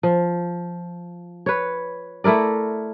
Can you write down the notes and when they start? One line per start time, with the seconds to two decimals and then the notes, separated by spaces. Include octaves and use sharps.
0.03 F3
1.46 B4 C#5
2.24 A3 E4 A#4 D5